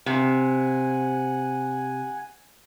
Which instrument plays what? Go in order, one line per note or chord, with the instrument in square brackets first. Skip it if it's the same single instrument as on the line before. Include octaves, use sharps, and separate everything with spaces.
[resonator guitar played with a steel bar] C3 [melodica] F#5 G#5